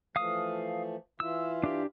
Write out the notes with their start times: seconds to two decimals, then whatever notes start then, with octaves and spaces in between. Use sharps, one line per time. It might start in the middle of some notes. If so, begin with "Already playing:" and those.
0.16 E3 F3 A3 F5 D#6
1.20 E3 E4 F4 E6
1.64 D4 G4